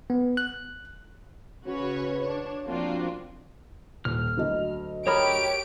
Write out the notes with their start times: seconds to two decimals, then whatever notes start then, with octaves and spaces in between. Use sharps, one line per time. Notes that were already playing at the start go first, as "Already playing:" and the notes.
0.10 B3
0.37 F#6
1.66 C#3 C#4 F#4 B4 C#5
2.23 D4 C#5
2.67 F3 A#3 C4 D4 F4 F#4
4.05 D#1 F6
4.37 D2 F#3 D#5
5.07 G4 G#4 A#4 C#5 B5 D7